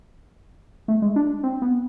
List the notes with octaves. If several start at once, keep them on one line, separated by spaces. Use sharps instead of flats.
A3
G#3
D4
C4
B3